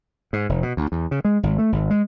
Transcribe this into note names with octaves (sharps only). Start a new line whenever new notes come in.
G#2
F1
B2
D2
E2
C#3
G#3
G#1
A3
G#1
G#3